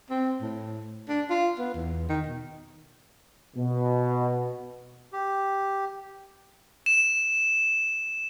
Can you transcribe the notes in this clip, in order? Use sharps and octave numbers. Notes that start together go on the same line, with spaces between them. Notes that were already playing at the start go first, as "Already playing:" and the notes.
C4
A2
D4
F4
B3
E2
D#3
B2
B2
G4
E7